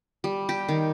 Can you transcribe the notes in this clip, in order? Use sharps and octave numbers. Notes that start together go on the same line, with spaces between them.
G3
G4
D#3